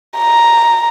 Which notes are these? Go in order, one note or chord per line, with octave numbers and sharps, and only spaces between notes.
A#5